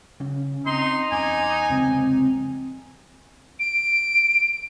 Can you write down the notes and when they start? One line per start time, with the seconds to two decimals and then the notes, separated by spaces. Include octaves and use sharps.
0.20 C#3 C#4
0.67 C4 D#4 C6
1.12 E2 G#5 D6
1.70 F1 C#2 A#2 C4
3.60 D7